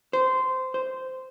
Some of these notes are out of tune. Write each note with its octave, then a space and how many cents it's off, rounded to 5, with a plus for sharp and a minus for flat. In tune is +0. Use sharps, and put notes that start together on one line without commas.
C5 -15
C5 -10